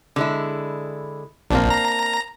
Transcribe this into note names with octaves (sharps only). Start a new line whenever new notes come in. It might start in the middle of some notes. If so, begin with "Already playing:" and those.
D3 G#3 E4
A#1 A#3 C4 D4
A#5